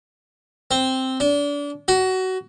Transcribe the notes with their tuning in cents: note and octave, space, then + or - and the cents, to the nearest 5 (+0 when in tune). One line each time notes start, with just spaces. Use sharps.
C4 +0
D4 -30
F#4 +20